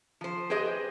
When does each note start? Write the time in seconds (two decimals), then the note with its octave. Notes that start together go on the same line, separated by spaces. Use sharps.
0.21 F3 C5
0.50 G4 G#4 B4 C5 D#5